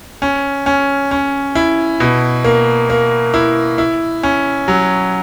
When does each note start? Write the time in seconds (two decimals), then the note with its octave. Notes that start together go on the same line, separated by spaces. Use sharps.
0.22 C#4
0.66 C#4
1.11 C#4
1.55 E4
2.00 B2
2.44 A#3
2.90 A#3
3.34 E4
3.78 E4
4.23 C#4
4.68 F#3